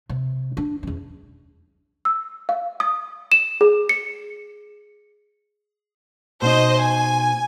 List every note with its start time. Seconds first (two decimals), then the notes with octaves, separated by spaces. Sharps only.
0.09 C3
0.57 D4
0.83 E2 C#4
2.05 E6
2.49 F5
2.80 D#6
3.32 E7
3.61 G#4
3.89 C#7
6.42 B2 D#4 C5 D#5
6.79 G#5